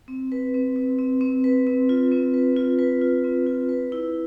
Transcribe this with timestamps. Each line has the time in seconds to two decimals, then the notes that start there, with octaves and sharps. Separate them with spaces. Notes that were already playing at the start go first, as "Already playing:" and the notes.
0.08 C4
0.32 B4
0.54 C4
0.76 C4
0.99 C4
1.21 C4
1.44 B4
1.67 C4
1.89 F4
2.12 C4
2.34 B4
2.57 F4
2.79 B4
3.01 F4
3.24 C4
3.47 F4
3.69 B4
3.92 E4